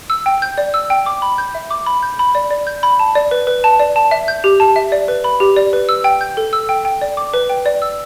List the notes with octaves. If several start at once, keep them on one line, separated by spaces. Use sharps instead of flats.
E6
G5
G6
D5
E6
G5
D6
B5
G6
E5
D6
B5
G6
B5
D5
D5
G6
B5
A5
D5
B4
B4
A5
D5
A5
E5
G6
G4
A5
E5
D5
B4
B5
G4
D5
B4
E6
G5
G6
A4
E6
G5
G5
D5
D6
B4
G5
D5
E6